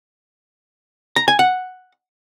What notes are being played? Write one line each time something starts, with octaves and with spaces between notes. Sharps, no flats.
A#5
G#5
F#5